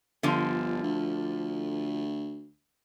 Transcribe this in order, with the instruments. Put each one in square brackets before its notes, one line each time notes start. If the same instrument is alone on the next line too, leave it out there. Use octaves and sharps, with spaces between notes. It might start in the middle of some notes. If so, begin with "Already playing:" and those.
[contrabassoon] G1 [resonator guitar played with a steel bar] D3 F3
[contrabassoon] D2